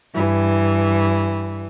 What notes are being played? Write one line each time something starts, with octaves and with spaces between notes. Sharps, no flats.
G2 E3